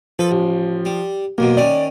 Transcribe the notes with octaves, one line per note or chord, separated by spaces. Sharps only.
F3 A4 B4
A1
G3
B1 E2 B2 A#3
D#3 C#4 D5